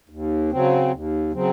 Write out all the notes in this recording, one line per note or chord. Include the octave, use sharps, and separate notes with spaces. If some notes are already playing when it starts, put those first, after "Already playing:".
D#2
C#3 F#3 C4
D#2
C#3 F#3 C4